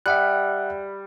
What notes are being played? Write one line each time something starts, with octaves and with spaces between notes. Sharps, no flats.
G3 E5 F#5 F#6